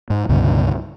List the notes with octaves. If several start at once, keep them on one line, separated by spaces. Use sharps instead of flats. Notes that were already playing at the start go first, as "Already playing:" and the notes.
G#2
C#2 G2 B2 D3